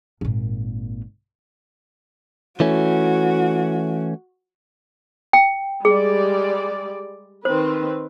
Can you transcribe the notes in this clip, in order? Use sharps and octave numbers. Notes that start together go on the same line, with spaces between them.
G#1 A#2
E3 A3 C#4 F#4
G5
G3 G#3 G#4 D5
D#3 C4 B4 C5